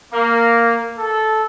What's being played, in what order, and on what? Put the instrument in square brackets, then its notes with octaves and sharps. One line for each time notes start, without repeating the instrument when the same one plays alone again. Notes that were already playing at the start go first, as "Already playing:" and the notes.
[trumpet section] A#3
A4